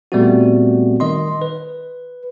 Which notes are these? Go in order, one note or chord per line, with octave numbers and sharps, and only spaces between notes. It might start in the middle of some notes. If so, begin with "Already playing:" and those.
A#2 G3 A3 B3 C4 F#4
D#3 D#5 C6
B4